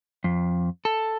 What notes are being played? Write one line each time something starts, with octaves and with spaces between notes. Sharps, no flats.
F2
A4